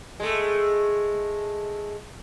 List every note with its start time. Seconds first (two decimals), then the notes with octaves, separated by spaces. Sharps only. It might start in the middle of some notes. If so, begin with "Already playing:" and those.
0.20 G#3 A3